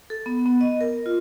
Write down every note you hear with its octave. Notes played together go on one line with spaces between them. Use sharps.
A4
B3
B3
D#5
A#4
F4